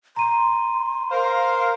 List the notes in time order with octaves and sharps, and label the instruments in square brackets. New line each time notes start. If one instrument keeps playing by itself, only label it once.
[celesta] A#5 D#7 [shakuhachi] C6
[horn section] A#4 C5 F5